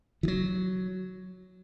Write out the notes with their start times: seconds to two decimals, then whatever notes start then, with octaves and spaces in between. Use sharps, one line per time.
0.23 E3
0.28 F#3